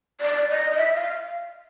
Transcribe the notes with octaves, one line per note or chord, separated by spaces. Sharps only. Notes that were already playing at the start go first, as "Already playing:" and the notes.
D5
D#5
D#5
E5
F5